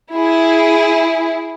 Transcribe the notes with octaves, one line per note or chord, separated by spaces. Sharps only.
E4 G#4